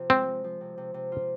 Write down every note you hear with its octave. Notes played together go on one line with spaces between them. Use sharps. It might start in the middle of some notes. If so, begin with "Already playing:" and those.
Already playing: C3 F3
G#3 C4
G#3
F3
C3
C3
C3
F4